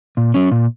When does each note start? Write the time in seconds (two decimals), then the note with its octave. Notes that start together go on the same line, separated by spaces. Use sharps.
0.17 A#2
0.34 F#3 C#4
0.51 A#2